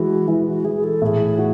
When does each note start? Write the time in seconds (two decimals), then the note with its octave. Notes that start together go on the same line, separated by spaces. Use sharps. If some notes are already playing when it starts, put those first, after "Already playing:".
Already playing: E3 G#3 F#4
0.28 E3 E4
0.46 F#4
0.64 E3 G#4
0.84 A4
1.02 A2 A4
1.06 G#4
1.39 F#4